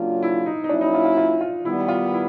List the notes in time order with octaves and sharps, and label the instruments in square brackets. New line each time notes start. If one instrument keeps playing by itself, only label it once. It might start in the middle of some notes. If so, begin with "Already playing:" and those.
Already playing: [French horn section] C#3 F#3 A#3 D4 F4
[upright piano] E4
D#4
D#4
[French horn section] F#3 A#3 C#4 E4 [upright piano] D4
[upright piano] D#4
F4
F4
F4
F4
[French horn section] D#3 G3 B3 [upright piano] E4
[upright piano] F4
E4